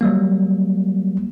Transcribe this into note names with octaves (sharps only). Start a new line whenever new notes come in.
F#3 G3 A#3